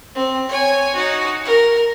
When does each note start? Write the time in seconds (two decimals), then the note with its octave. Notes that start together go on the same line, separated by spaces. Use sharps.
0.15 C4
0.49 C#5 G#5
0.95 D#4 F#4
1.45 A#4